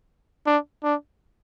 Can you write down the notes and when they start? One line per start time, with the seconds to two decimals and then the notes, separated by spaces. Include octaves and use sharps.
0.46 D4
0.83 D4